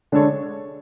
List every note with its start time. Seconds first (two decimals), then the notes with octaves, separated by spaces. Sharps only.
0.12 D3 G#3 D4 A4 C#5